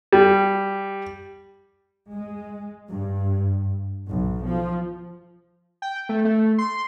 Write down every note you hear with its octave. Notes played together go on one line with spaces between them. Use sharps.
G3
G#3
G2
B1
F3
G5
A3
A3
C6